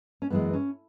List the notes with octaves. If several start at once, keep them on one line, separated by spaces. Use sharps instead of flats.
C#4
F#2 E3 G#3 B3
C#4